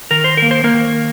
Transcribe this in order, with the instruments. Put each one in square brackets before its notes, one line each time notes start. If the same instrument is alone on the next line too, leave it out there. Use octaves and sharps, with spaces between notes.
[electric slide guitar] D#3 A#4
C5
A#3 A#4
C5
A#3 A#4
D#3